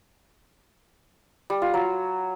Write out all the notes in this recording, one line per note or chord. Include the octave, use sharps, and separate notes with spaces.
G3
F4
F#3